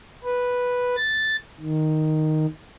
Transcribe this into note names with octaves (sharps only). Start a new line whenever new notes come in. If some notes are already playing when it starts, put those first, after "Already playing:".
B4
A6
D#3